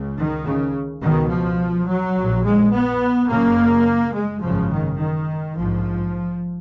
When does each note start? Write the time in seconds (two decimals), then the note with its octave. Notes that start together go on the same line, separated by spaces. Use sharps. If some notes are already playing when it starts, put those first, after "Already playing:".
Already playing: C#2 C#3
0.18 D#3
0.45 C#3
1.02 C#2 B2 D#3
1.30 F3
1.88 F#3
2.16 A#1 A#2
2.45 G#3
2.73 B3
3.30 F#1 F#2 C#3 A#3
4.15 G#3
4.42 G#1 F#2 C#3 F3
4.72 D#3
5.00 D#3
5.56 A#1 G#2 F3